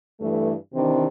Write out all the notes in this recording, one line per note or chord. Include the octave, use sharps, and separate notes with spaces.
G2 E3 A3
C3 D#3 E3 C4 D4